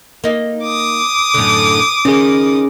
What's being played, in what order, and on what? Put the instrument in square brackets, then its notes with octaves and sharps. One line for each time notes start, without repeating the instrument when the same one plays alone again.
[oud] A#3 D#4
[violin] D6 D#6
[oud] F#2 A2 D3
[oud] D#3 [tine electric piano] C#4 G#4